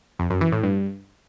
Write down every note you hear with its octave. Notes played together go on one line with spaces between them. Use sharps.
F2
F#2
E3
A2
G2